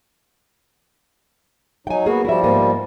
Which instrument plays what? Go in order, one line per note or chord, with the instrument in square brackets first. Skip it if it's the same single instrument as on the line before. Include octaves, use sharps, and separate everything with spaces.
[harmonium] F#3 D#4 [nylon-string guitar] G5 G#5
[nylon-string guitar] A#3 G#4 [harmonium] B3 F#4
[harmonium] F3 G3 [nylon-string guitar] E4 F#4 E5
[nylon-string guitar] G#2 A#3 B3